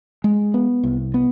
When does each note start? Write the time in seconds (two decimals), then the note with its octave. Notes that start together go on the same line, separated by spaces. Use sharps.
0.24 G#3
0.54 B3
0.83 C2
1.14 B3